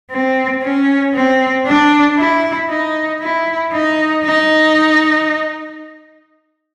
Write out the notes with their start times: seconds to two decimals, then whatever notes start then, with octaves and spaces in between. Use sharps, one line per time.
0.11 C4
0.63 C#4
1.14 C4
1.66 D4
2.18 E4
2.70 D#4
3.21 E4
3.73 D#4
4.25 D#4